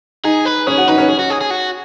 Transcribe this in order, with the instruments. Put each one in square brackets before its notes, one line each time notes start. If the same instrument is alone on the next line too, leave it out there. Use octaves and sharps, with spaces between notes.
[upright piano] D#4 [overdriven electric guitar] G#4
[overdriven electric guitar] B4
[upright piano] C#4 [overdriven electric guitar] G#4
[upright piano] F#4
[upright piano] D#4 [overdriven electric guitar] B4
[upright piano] C#4
[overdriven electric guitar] G#4
F#4
G#4
G#4
F#4